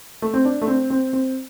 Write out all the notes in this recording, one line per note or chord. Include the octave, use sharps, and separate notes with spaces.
A3
C4
D4
A3
C4
C4
C4